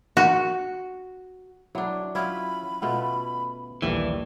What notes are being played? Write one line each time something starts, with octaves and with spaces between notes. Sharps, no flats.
F#4
F#3 D4 E4
F#3 C#4 E4 F4 B5
B2 A3 F4 F#5
A#1 D#2 E3 G3 A3